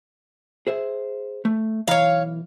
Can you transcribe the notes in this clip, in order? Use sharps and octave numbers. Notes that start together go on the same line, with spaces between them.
G#4 C5 E5
A3
B1 E3 C#5 F5 A#5